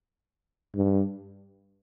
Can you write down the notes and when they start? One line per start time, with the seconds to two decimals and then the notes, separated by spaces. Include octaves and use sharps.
0.75 G2